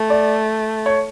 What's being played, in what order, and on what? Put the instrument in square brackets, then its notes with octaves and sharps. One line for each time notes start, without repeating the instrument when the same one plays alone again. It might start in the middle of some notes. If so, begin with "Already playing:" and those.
Already playing: [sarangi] A3
[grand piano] D5
C#5